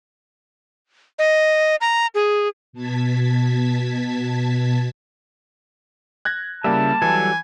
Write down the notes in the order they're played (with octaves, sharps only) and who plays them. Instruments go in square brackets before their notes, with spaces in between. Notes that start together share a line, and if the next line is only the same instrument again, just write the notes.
[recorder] D#5
A#5
G#4
[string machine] B2 A5 G#6 B6
[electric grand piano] F#6 G#6 A#6
[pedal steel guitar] C#3 E4 E5 [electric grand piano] G3 A#3 [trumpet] A5
[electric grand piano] E3 [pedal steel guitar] F#3 G3 A4 [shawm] G#5